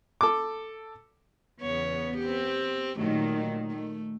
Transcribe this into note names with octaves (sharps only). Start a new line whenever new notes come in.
A4 D6
E2 C#3 B3 C#5
C4 G4
A#2 D#3 F#3 A3
A3